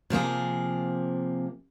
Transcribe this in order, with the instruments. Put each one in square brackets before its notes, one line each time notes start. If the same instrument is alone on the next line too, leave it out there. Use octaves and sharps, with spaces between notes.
[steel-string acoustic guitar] C3 F3 A#3 G#4